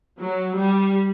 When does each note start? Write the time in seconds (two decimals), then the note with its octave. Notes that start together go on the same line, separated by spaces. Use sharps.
0.19 F#3
0.57 G3